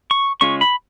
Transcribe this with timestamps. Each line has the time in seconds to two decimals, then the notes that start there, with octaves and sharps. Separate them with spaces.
0.11 C#6
0.41 C#3 G#3 C#4 F4 C#6
0.61 B5